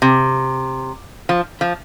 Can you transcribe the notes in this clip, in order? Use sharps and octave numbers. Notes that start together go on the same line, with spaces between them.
C3
F3
F3